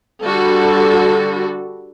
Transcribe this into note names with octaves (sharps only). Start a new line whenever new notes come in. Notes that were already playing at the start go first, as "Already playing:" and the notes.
D3 G3 F#4 A4